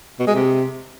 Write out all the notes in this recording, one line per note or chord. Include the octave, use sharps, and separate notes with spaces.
B2
G#3
C3